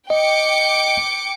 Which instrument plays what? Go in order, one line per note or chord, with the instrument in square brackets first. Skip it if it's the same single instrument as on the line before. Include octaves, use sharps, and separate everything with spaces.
[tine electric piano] D#5 [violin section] G5 D6 C#7